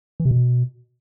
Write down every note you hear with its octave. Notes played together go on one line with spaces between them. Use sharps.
E3
C3
B2